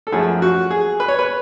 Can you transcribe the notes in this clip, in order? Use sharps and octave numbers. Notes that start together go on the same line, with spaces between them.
A4
F#2 F3 A3 G#4
F#4
G#4
B4
C#5
B4